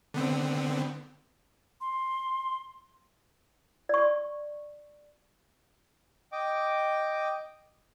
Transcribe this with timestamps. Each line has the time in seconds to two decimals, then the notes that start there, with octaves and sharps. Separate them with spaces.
0.14 D3 B3 C4
1.81 C6
3.89 D5 C#6
6.32 D#5 G5 D6